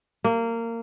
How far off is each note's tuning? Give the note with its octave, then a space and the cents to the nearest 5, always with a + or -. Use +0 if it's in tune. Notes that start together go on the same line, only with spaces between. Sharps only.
A#3 -20